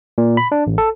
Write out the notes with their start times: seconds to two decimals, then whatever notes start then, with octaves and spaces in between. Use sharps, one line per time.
0.18 A#2
0.37 B5
0.52 D4
0.67 A1
0.78 A4